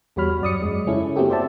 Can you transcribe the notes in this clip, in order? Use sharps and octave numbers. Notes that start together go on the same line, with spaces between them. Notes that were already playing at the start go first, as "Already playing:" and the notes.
E2 G3 F#4 C#5 B5 F6
F#2 D5 D#6 C#7
F#2 G#3
C#3 C#4 E4 A4
A#3 C4 E4 F#4 G4 A4
C5 D5 E5 A5